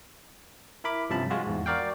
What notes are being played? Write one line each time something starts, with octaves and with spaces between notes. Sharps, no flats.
E4 A#4 B5 D6
G2 C3 F3 C#4 A5 B5
G#3 F4 F#4
E2 G#2
F#4 A#4 D5 F5 G5